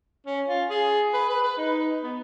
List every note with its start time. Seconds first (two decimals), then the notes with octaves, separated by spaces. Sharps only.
0.26 C#4
0.48 F4
0.70 G#4
1.14 B4
1.29 B4
1.43 B4
1.58 D#4
2.03 B3